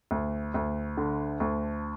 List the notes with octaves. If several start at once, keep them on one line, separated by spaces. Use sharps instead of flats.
D2
D2
D3
D2